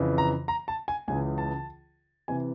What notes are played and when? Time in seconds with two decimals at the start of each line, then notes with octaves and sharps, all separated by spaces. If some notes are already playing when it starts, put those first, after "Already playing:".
Already playing: F2 C#3 E3
0.18 A#5
0.48 A#5
0.68 A5
0.88 G#5
1.08 C#2 C#3 E3 G#5
1.38 A5
2.28 C3 E3 G#5